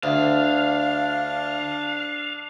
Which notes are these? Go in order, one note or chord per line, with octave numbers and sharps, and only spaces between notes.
D2 D4 F5